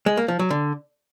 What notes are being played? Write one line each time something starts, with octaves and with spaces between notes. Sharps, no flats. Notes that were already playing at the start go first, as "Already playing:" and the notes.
G#3
A#3
F3
F#3
D3